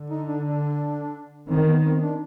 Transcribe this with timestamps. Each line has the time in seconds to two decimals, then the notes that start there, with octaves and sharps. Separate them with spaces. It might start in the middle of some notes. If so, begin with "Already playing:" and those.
Already playing: D3
0.10 D#4
0.28 D4
0.45 D4
1.49 D#3 C4
1.67 B3
1.85 C4
2.02 D4